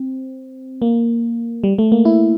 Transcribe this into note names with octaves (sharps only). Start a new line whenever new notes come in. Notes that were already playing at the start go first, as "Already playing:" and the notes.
Already playing: C4
A#3
G3
A3
A#3
E4